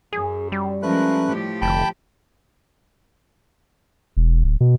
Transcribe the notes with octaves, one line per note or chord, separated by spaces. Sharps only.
F#2 G#4
G3
F3 G#3 A3 C#4 A#4 B4 F#6
A2 F3 G4
F1 D3 G5 A5 B5
E1
D1
B2